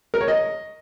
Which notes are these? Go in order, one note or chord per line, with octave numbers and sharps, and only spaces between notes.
A#4
C#5
D#5